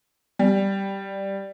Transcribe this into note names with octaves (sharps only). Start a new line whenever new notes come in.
G3